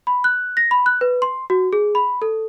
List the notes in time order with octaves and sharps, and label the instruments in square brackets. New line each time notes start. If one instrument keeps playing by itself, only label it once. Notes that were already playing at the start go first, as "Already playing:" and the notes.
[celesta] B5
F#6
A#6
B5
F#6
B4
C6
F#4
G#4
B5
A4